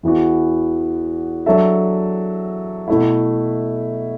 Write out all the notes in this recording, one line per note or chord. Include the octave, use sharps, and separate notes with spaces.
E2 E3 B3 F#4
F#3 D4 A4 E5
B2 A3 E4